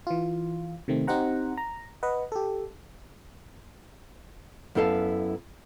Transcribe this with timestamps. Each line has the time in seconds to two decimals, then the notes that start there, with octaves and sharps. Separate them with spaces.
0.07 E3 F4
0.88 C3 D#3 A3 C4
1.07 C4 D#4 G4 C5 F#5 A#5
1.58 A#5
2.03 B4 D#5 F#5
2.32 G4 A4
4.75 F#2 B3 E4 A4 F5 A5